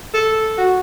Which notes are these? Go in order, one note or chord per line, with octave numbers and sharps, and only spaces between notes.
A4
F#4